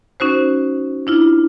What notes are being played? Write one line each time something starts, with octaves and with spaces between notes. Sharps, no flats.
C#4 D#4 F#4 C5
D4 E4 F4